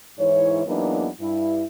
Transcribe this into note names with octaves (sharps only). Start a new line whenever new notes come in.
G#2 E3 E4 C#5
E2 F#3 A#3 B3 D4 D#4
G2 E4